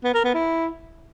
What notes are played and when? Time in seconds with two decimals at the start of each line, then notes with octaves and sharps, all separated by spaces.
0.04 B3
0.14 A#4
0.24 B3
0.34 E4